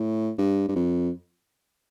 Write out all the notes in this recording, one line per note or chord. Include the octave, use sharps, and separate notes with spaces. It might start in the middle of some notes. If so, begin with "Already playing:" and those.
Already playing: A2
G2
G2
F2